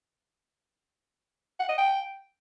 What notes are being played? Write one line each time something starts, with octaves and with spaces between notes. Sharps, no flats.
F#5
D#5
G5